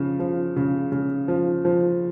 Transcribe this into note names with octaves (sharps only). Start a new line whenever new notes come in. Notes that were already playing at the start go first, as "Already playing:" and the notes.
Already playing: C#3 F3
F3
C#3
C#3
F3
F3